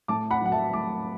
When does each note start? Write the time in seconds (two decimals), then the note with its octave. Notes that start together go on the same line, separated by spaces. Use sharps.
0.08 A2 A5 D6
0.31 F#5 B5
0.41 F#3 F#5
0.52 E5 A5
0.73 A2 A5 D6